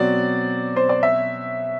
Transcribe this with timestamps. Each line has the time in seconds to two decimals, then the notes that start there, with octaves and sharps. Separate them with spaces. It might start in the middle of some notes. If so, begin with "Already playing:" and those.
Already playing: B2 F#3 C4 F#4 D5
0.76 C5
0.89 D5
1.03 E5